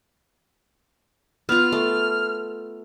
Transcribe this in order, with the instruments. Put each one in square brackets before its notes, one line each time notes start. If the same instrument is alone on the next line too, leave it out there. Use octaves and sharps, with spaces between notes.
[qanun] B3 F4 [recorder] F6
[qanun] A3